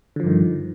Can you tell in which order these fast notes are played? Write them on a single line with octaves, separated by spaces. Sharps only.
D3 F3 G2 D#3